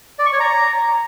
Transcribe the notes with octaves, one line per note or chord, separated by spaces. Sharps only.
D5
C#6
C#5
A#5